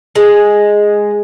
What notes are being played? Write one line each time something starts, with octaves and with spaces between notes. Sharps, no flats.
G#3